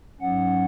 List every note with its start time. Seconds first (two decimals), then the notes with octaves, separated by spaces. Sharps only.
0.21 G#2 F#3 C#4 F#5